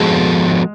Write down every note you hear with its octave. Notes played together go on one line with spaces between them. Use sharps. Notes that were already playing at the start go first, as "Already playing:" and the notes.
Already playing: F3 G#3 B3 F#4 A4